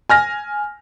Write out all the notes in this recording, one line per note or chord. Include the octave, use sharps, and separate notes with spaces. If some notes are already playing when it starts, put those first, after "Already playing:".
G#5 F6 A#6